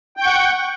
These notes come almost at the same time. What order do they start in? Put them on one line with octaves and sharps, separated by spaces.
G5 G6 C#6 F#5